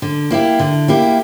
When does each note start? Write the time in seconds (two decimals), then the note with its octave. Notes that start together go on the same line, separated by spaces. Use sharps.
0.02 D3
0.30 A#3 E4 G4
0.59 D3
0.88 A#3 E4 G4